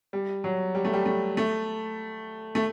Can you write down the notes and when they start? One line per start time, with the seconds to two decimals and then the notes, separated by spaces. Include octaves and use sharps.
0.13 G3
0.44 F#3
0.75 G3
0.85 A3
0.93 G3
1.06 A3
1.37 A3
2.55 A3